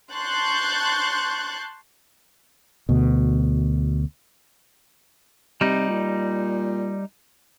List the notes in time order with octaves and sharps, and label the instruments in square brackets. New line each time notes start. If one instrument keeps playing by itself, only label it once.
[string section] A5 C6 C#6 F#6 G6 A6
[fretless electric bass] D2 B2
[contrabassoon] C3 [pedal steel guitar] G3 D#4
[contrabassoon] A#2